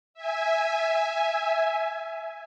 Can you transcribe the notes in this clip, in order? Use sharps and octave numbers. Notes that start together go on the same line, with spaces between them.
E5 G#5